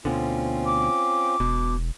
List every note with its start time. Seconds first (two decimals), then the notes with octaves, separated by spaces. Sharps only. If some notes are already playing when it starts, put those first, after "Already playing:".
0.05 D2 B2 D3 C4 C#4 F4
0.66 D6
1.40 E1 B2